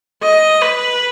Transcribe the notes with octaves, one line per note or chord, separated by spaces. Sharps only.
D#5
B4